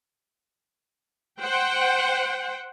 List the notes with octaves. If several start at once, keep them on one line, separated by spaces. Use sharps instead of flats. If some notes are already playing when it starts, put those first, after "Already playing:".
C5 F#5 G5